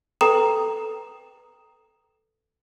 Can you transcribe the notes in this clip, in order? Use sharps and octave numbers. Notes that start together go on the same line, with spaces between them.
A4 B4 G5 A#5 D#6 E7